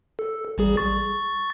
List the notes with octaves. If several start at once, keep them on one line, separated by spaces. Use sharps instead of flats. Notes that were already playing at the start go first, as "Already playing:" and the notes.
A4
A1 G3 G#4
C#6 A6